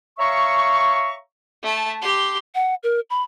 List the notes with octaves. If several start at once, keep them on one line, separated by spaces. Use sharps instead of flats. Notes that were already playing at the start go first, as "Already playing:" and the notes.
C#5 E5 F5 A#5 C#6
A3 A5
G4 C6
F#5
A#4
B5